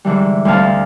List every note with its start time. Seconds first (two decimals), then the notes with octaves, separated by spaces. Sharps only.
0.05 G#2 D3 E3 G3
0.45 D2 G3 C4 F5 A5